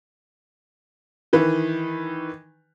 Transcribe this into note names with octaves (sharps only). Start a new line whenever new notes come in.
D#3 E3 B4